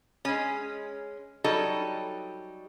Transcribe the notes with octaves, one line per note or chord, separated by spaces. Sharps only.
G#3 C#4
F#3 G3 D#4 A4